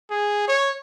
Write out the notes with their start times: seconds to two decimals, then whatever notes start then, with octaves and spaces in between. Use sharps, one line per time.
0.10 G#4
0.48 C#5